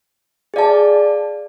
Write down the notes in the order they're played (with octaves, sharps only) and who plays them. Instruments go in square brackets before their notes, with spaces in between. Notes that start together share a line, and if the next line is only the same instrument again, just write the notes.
[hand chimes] G#4 D5 F5 A5